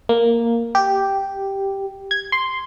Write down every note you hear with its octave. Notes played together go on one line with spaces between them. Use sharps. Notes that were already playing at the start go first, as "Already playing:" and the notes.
A#3
G4
G#6
C6